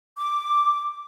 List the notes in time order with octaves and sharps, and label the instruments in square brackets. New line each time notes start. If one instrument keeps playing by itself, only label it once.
[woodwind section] D6